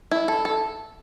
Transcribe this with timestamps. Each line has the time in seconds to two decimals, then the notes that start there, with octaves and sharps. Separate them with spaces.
0.11 E4
0.28 A4
0.45 A4